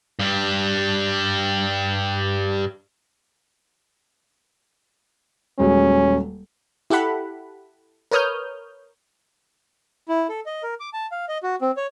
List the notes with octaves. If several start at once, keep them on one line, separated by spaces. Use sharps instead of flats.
G2 G3
D#1 F#3 G#3 C#4
E4 G4 A4 F#5 B5
A#4 B4 C#5 D#6 F6 G6
E4
A4
D#5
A#4
D6
A5
F5
D#5
F#4
C4
C#5